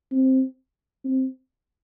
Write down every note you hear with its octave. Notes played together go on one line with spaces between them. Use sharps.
C4
C4